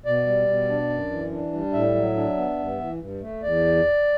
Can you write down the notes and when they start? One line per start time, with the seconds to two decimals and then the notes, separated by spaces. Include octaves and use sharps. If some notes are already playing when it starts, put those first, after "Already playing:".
0.06 B2 D5
0.26 G3
0.48 B2
0.69 D4
0.90 F#2
1.11 E3
1.31 D4
1.53 G3
1.73 A2 E5
1.95 F#3
2.16 D4
2.37 B3
2.59 G2
2.79 E3
3.00 G2
3.21 A3
3.42 E2 D5